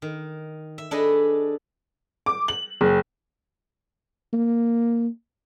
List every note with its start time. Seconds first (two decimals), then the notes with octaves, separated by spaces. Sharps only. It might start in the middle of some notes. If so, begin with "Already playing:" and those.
0.02 D#3
0.78 E5
0.91 D4 G#4 A4 B4 D#5
2.26 D6
2.48 F#7
2.81 F#1
4.33 A#3